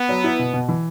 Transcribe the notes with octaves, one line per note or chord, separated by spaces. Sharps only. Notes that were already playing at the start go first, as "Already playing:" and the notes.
Already playing: B3
F#3
E4
B2
B2
E3